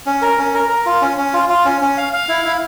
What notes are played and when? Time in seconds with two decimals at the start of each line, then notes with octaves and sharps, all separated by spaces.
0.06 C#4
0.22 A#4
0.38 C#4
0.54 A#4
0.69 A#4
0.86 F4
1.02 C#4
1.17 C#4
1.34 F4
1.49 F4
1.65 C#4
1.81 C#4
1.97 F5
2.13 F5
2.29 E4
2.45 E4